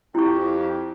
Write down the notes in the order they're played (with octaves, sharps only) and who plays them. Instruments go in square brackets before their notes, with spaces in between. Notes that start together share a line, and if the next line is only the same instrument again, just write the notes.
[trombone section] F2 G4 [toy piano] E4 C#6